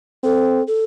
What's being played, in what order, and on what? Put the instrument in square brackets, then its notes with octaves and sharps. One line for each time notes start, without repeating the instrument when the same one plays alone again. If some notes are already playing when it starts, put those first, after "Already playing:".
[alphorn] C4 [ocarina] A4
[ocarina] A4